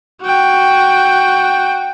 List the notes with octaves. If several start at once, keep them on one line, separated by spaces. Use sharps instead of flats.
F#4 G5